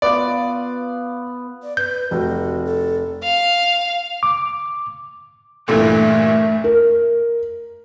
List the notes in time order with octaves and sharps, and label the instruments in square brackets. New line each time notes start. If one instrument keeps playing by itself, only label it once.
[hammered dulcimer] B3 F4 [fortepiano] D5
[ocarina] D5
[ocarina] B4 [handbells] G6
[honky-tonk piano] F1 [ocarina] F#4
[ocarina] A4
[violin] F5
[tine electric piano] D6
[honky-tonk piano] G2 A#2 E3 [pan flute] A3 [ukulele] F4 A4 E5
[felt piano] A#4